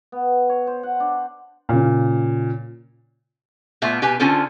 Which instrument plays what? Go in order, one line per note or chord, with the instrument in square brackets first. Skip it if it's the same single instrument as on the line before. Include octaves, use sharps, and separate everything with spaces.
[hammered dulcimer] B3
C#5
C5
F#5
D4
[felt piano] A#2 C#3
[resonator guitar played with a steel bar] A#2 A3 B3 F4 E5
B2 G4 B4 G#5
D3 C#4 F4 A4 C5